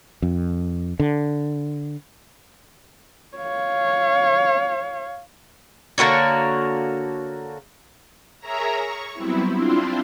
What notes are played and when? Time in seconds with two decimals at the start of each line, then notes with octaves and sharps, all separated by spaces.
0.22 F2
1.00 D3
3.37 C#5 F5
5.98 D3 A#3 F#4 C#5
8.39 G#4 A#4 C#5 E5 A#5
8.72 C#6
9.14 F#3 G3 B3 C4 E4
9.54 C4 D4 E4 F4 C5